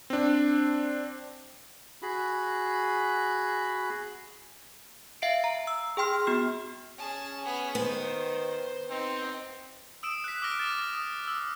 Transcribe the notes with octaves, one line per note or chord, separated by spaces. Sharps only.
C4 D4
F#4 G#4 B5
E5 F5 C7 D7
A#5
E6
G#4 G5 C6 F6
B3 F#4 F6
C#4 G#4 A5
B3 G#4
D#3 B3 C5
C4 D#4
D#6 E6 D7 E7
F#6 B6
D6 E6 F6 A#6 D7
D6 F6 A6 D7 E7
D#6
E6